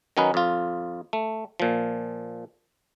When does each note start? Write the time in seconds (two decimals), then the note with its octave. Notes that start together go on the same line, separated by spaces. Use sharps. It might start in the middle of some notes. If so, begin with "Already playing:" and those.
0.17 D#3 F#3 C#4 D#4 B4
0.34 F2 F4
1.13 A3
1.60 A#2 F3